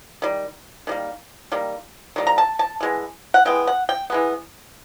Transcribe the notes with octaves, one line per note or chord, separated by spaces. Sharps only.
D#3 G3
D#3 G3 A#3
D#3 G3 A#3
D#3 G3 A#3
A#5
A5
A5
E3 G#3 B3
F#5
E3 G#3 B3 G5
F#5
G5
E3 G#3 B3